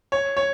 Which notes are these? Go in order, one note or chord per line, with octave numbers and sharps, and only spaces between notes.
C#5
C#5